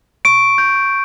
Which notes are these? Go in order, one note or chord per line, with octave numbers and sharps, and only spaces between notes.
C#6 D7
G6